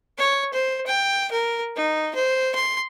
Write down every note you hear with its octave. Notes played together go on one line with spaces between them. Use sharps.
C#5
C5
G5
A#4
D#4
C5
C6